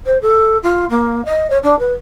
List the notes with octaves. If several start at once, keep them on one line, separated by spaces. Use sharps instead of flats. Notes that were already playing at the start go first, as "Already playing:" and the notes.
C5
A4
F4
A#3
D#5
C#5
D4
B4